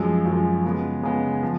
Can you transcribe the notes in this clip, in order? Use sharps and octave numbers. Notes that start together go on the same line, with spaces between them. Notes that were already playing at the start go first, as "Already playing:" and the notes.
Already playing: F#2 F3 G#3
F#2 F3 G#3
C#3 G#3 B3
C#3 G#3 B3
F3